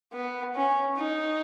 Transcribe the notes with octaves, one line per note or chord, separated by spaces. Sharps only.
B3
C#4
D#4